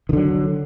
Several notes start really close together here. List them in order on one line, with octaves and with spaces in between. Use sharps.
D#3 D3 F#3